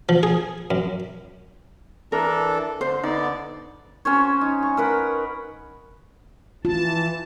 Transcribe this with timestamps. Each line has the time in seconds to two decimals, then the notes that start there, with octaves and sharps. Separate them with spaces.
0.09 F3
0.23 G#4
0.71 F#2
2.12 E3 D4 A4 A#4
2.81 D3 C5
3.03 D3 B3 D#4 D5
4.05 C#4 F#4 C5 C#5
4.41 D#4
4.63 C#6
4.77 A#4 B4 F#5
6.65 E3 F4 A5